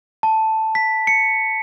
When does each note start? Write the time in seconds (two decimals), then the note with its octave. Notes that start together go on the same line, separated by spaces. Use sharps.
0.23 A5
0.75 B6
1.07 C#7